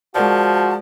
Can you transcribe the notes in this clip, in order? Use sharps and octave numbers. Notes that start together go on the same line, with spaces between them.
F3 G#3 F#4 A#4 D5 A5